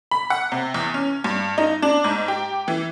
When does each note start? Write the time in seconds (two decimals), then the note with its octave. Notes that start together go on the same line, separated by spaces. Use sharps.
0.11 B5
0.30 F#5
0.52 C3
0.74 E2
0.94 C#4
1.24 G2
1.58 D#4
1.82 D4
2.04 G#2
2.28 G4
2.68 E3